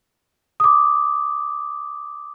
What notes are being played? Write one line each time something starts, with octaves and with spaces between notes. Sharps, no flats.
D6 D#6